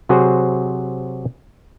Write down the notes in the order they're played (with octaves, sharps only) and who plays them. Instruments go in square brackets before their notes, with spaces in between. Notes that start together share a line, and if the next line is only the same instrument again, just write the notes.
[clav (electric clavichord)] C3 F#3 F#4 G#4 C5